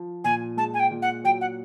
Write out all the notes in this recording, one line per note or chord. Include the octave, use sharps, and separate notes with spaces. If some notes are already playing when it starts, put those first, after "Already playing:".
Already playing: F3
A#2 G#5
G#3 A5
G#5
G5
A#2
F#5
F#3 G5
F#5